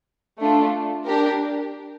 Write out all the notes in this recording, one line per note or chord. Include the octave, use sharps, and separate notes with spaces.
A3 D4 F4
D4 G4 A#4